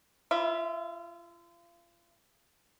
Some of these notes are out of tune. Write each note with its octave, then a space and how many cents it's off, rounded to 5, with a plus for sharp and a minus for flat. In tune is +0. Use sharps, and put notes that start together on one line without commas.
F4 -35 E5 +0 B5 +0